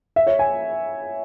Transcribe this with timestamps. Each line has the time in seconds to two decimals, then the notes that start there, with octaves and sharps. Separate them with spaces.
0.16 E5
0.27 C#5
0.39 G#5